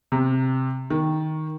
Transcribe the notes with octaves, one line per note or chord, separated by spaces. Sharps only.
C3
D#3